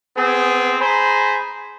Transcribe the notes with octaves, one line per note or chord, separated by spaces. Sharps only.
B3 C4 G#4
G#4 C5 A#5 B5